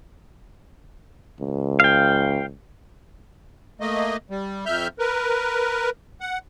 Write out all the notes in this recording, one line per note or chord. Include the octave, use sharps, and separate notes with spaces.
C#2
F5 G5
A3 A#3 D#5
G3
F2 E5 F6 G6
A#4 B4
F#5